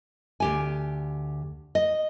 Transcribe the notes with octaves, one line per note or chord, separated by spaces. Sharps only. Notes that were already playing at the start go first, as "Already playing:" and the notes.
D2 G4 G#5
D#5